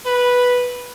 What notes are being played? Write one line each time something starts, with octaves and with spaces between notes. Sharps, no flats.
B4